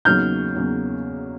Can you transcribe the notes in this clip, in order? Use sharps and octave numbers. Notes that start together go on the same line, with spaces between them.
E2 C#3 F#3 A#3 D#4 F6 G6
E2 C#3 F#3 A#3 D#4